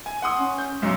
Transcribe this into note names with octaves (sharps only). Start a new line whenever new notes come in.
G#5
F#5 C6 D#6
C#4
G6
B1 F#2 G#3 C6